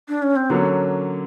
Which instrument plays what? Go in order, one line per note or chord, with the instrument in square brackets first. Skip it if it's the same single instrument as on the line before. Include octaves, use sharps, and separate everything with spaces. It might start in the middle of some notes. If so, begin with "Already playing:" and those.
[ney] D4
C#4
C4
[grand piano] D3 F#3 A#3 C#4 [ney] B3